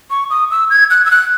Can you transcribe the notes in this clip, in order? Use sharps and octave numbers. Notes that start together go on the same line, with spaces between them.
C#6
D#6
E6
G#6
F#6
E6
F#6